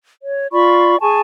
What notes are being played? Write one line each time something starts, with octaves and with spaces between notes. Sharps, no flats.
C#5
F4 D5 B5 C#6
G#4 G#5 A5 C#6